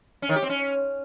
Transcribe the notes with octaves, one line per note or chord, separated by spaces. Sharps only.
C#4
D#3
G4
C4
C#4